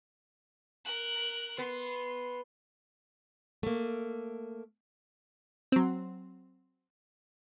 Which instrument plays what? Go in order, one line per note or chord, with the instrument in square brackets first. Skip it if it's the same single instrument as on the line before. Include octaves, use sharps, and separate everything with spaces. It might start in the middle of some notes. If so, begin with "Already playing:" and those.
[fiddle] A#4 F#6
[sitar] B3 [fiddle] C6
[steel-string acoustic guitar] A3 A#3
[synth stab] F#3 C4